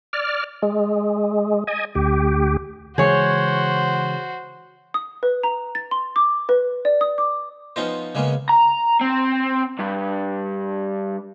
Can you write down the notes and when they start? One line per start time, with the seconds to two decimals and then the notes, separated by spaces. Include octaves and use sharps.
0.13 D5 F6
0.62 G#3
1.67 D#5 G#5
1.95 D2 G4
2.98 C#3 E3 G#3 F#4 G#4 C5 C#5
4.94 D#6
5.23 B4
5.43 A#5
5.75 A6
5.91 C6
6.16 D6
6.49 B4
6.85 D5
7.01 D#6
7.18 D6
7.76 F3 B3 C#4 D#4 F4 C5
8.15 C#3 G#3 A#3 B3 C#4
8.49 A#5
9.01 C4
9.79 G2